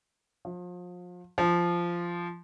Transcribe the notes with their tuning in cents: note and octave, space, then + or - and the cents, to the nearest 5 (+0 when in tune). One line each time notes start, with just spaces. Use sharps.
F3 +35
F3 -10